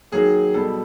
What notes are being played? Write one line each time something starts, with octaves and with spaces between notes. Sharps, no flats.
D#3 F#3 A#3 G#4
B2 G3 B3 A4